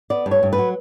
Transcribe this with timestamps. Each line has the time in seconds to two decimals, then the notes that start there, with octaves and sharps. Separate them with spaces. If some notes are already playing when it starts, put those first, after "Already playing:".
0.10 B3 D5
0.26 G2
0.31 C#5
0.43 G2
0.53 B4
0.58 F#3